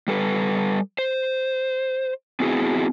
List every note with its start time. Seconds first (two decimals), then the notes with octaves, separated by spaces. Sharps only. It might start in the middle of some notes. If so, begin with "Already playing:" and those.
0.08 G3 A4 B4
0.99 C5
2.40 B3 C4 E4 F#4 G#4